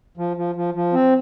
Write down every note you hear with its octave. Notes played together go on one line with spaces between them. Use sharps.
F3
F3
F3
F3
C4